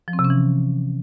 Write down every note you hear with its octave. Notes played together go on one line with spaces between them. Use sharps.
F3
C4
C3
C#4
E3